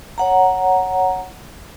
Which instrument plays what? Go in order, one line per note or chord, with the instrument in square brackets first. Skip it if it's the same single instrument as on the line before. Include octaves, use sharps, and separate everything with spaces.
[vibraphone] C#5 F#5 A#5